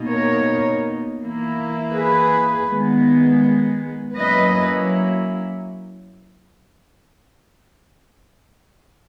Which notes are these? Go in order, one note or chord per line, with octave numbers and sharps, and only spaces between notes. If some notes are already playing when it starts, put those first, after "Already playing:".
Already playing: B2 A#3 D#4
A#4 C#5
E3 A#3 E4
G#4 B4
D#3 G#3 B3
F#3 A#3 C#4 E4 B4 D#5